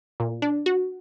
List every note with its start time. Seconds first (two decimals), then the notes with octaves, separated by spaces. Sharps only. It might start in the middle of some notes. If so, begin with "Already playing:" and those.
0.20 A#2
0.42 D4
0.66 F#4